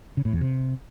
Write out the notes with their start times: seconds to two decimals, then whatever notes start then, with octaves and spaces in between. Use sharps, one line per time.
0.17 C#3
0.25 A2
0.33 E2
0.41 C3